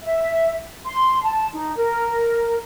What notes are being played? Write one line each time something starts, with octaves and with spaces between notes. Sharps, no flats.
E5
C6
A5
D#4
A#4